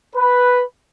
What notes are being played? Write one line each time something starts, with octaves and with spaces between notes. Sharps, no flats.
B4